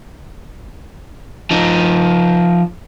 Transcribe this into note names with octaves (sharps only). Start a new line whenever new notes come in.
F3 D#4